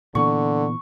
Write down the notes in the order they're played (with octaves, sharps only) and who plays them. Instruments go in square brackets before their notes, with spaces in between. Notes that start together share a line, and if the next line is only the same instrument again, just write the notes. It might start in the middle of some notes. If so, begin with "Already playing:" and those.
[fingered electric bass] A#2 E3 B3 [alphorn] D3 [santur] C#6